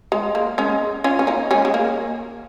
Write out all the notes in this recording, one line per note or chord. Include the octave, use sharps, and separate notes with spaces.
G#3
A#3
G#3 C#4
C#4 F4
C#4
A#3 D#4
G#3 C#4
G#3
A#3